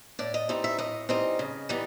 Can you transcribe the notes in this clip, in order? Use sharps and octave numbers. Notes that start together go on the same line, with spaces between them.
A2 D5
D#5
E3 G3 C4 D#4
E5
A2 D#5
E3 G3 C4 D#4 D#5
C#3
E3 G3 B3 D#4